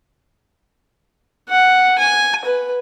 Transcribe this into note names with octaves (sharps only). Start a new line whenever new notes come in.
F#5
G#5
B4